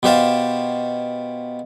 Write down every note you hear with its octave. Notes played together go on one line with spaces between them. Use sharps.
B2 G4 C5 F5 A5